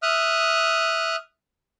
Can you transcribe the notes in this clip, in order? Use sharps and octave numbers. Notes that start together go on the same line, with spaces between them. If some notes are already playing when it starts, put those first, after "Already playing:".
E5 D#6 F6 F#6